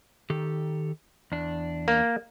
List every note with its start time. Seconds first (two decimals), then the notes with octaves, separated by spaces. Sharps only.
0.30 D#3 G4 A4
1.32 E2 D4
1.88 A#3